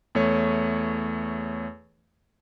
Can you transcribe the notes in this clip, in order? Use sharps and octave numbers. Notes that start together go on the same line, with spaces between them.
E2 A3 C#5